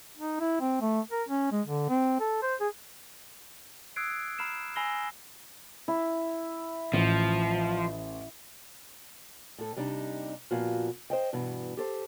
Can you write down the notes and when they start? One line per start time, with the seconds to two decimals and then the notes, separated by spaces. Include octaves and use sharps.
0.17 D#4
0.40 E4
0.61 C4
0.81 A3
1.11 A#4
1.29 C#4
1.52 G#3
1.67 D3
1.89 C4
2.20 A4
2.42 C5
2.60 G#4
3.96 D#6 E6 F#6 G#6 C7 D7
4.39 A#5 B5 F6 C7 E7
4.76 G#5 B5 E6 A#6 C7 G7
5.88 E4
6.93 A1 F3
9.58 A2 A4
9.77 C3 G3 D4 D#4 G4
10.51 A#2 F3 B3 F4 F#4
11.10 C5 D#5 G5
11.33 G2 B2 E3
11.77 G4 A4 C5